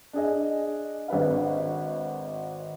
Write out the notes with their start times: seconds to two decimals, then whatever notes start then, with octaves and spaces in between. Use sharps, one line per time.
0.13 D4 G#4 D#5
1.08 G#1 D4 B4 F5